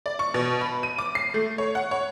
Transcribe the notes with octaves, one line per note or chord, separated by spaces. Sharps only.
D5
C#6
B2
B5
D#7
D6
C7
A3
C#5
F#5
C#5